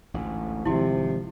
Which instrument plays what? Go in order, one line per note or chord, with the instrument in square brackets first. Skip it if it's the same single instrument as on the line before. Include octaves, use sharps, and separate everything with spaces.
[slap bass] A1 D2 G#2
[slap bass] G#1 [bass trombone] C3 [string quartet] F3 [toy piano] E4 F#4